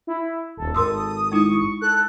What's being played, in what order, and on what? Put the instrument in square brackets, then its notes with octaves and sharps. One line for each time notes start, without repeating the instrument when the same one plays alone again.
[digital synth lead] E4
[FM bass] D#1 [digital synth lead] A4
[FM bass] G#1 [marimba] A#4 C6 E6 [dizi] D#6
[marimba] G#3 D#4 E4 [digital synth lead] C#6
[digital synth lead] A4 [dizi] F#6